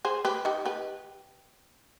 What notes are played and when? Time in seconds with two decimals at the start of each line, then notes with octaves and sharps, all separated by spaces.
0.05 G#4 C5
0.25 G4 B4
0.45 D#4 G4
0.66 G4 B4